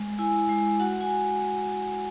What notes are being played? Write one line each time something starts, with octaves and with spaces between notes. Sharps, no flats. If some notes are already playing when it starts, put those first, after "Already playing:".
Already playing: G#3
E4 G#5
G#3 G#5
F#4 F#5
G#5